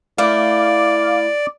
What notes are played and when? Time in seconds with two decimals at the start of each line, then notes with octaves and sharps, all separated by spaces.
0.18 A3 E4 D5 F5 D6